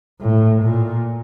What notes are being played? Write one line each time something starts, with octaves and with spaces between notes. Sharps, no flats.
A2
A#2